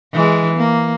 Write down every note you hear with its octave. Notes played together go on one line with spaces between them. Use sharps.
E3 G#3
A#3